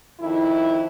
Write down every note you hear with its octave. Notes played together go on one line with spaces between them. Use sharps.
F2 D#3 E4